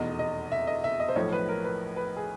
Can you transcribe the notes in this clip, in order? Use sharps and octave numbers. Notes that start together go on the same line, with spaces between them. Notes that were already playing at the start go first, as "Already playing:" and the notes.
Already playing: F1 E2 B2 D#5
D#5
E5
D#5
E5
D#5
C5
B1 A2 F3 C#5
B4
A#4
B4
B4
G#4